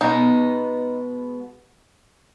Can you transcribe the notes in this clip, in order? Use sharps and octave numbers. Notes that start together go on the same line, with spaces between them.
B2 G#3 B3 D#4